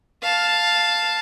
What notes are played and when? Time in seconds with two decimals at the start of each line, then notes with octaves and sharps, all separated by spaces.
0.22 F5 A5